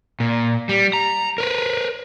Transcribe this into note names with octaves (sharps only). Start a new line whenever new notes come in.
A#2
G3
A#5
A#4 B4